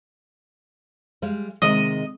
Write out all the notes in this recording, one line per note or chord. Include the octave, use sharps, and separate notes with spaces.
G3 G#3 F5
C3 D#3 G#3 D#5